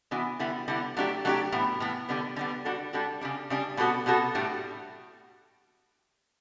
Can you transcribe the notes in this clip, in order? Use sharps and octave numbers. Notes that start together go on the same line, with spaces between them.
E3 B3 D4 F#4
D3 G3 B3 E4
D3 G3 B3 E4
F#3 A3 D4 G4
F#3 A3 D4 G4
A2 E3 B3
A2 E3 B3
D3 G3 B3
D3 G3 B3
G3 D4 F#4 A4
G3 D4 F#4 A4
C#3 G3 D4
C#3 G3 D4
B2 G3 B3 F#4 A4
B2 G3 B3 F#4 A4
A2 G3 D4